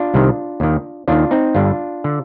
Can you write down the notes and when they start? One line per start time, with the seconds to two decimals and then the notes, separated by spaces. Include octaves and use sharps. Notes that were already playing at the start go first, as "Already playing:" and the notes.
Already playing: D4 F4
0.14 C2 C3 D#3
0.60 D#2 D#3
1.08 D#2 D#3 D4 F4
1.31 C4 D#4
1.55 G1 G2 D3 D4 F4
2.04 D3